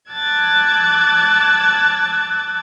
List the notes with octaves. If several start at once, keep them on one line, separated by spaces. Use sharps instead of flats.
A5 D6 E6 F#6 G#6 A6